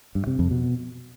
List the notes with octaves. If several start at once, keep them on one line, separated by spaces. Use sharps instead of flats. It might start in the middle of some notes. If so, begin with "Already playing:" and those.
G2
C3
F2
B2